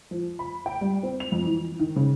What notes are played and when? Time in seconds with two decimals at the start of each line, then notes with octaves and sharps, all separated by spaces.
0.11 F3
0.39 B5
0.66 G5
0.81 G3
1.03 C4
1.20 F7
1.32 F2
1.46 E3
1.79 D#3
1.96 C#3